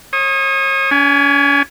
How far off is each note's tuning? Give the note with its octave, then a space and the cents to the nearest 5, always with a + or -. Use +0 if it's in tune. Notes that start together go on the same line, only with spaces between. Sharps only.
C#5 -35 D#6 +0
C#4 +40 G#5 +0